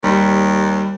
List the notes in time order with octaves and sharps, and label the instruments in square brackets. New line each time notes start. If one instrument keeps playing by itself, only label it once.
[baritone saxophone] D#2 [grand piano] G3